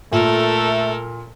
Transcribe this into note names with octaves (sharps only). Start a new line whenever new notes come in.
A#2 A3 A4 A#4 E5